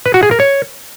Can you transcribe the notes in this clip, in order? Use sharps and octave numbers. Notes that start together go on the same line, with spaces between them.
B4
F#4
G#4
A#4
C#5